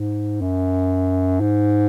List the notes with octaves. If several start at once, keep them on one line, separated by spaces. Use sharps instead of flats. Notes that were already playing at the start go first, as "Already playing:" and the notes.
Already playing: G#2
F#2
G#2